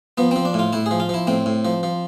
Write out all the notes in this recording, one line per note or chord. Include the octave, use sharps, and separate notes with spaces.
F3 B3
F3 C4
D4
A2 F4
A2 E4
G#4
F3
F4
F3 E4
A2 C4
A2
F3
F3